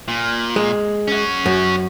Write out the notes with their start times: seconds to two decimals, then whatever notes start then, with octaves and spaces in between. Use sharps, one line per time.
0.08 A#2
0.56 G#3
1.08 C#4 F#4
1.46 F#2